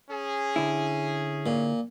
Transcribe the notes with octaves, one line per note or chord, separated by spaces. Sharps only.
C#4 G#4
D3 E4
A#2